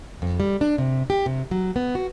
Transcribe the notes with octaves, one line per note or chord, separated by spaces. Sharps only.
F2
G3
D4
C3
G4
C3
F#3
B3
F#4